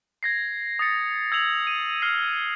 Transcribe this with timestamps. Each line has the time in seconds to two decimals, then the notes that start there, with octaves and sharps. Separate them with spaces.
0.23 G#6 A#6 C7
0.79 D#6 A6 C#7
1.32 E6 G#6 A6 F7 F#7
1.67 D#7
2.02 F6 C7